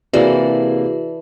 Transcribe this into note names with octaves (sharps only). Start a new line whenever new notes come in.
C3 E3 A#3 F#4 G#4 A4 D5